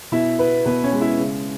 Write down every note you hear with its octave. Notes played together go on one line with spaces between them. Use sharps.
B2 E4 E5
B3 B4
B2 B3 B4
C#4 C#5
G#3
E4 E5
C#3